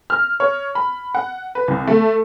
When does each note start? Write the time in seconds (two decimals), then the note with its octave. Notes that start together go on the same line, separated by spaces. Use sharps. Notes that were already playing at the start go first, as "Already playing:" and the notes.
0.10 F6
0.40 C#5
0.75 B5
1.15 F#5
1.55 B4
1.68 C2
1.87 A3